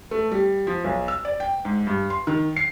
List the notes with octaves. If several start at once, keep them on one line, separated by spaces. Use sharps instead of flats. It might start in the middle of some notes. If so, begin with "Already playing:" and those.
A3
G3
F3
B1
E6
D5
G5
G#2
G2
C6
D#3
C7